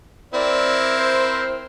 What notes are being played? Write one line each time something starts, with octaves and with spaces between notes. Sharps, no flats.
C4 E4 A#4 D5
C5